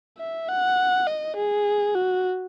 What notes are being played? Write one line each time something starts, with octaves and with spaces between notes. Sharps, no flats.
E5
F#5
D#5
G#4
F#4